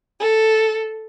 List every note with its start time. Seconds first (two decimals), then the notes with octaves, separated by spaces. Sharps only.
0.20 A4